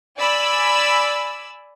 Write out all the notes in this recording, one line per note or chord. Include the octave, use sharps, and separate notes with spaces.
D5 G#5 B5 E6